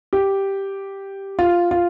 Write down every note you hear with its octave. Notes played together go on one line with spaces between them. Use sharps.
G4
F4
F4